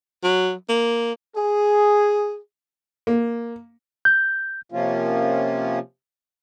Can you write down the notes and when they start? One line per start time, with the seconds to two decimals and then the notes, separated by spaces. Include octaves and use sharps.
0.23 F#3
0.69 A#3
1.36 G#4
3.07 A#3
4.05 G6
4.72 C3 F3 A#3 C#4 F4